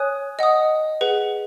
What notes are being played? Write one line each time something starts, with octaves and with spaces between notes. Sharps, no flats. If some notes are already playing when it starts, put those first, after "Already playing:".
Already playing: C#5 G#5 D#6 F#6
D#5 F#5 D#6
G#4 B4 F#5